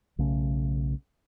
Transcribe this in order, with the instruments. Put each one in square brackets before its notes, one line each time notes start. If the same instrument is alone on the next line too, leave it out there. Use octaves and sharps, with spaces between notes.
[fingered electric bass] B1 C#3 A3 C#4